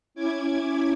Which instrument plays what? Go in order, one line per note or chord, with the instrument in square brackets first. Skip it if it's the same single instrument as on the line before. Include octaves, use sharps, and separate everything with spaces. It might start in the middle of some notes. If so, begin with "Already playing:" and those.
[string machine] C#4 E4 D6 G#6